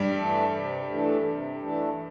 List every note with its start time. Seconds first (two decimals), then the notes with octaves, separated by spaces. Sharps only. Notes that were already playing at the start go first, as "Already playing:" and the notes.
Already playing: G2 G3
0.16 E3 A3 D4 A4
0.52 C3
0.88 E3 A3 D4 A4
1.24 C3
1.60 E3 A3 D4 A4